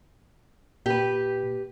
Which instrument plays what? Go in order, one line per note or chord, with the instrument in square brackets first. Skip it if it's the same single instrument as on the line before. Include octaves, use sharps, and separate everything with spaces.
[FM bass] A#2 [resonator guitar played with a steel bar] G4 B4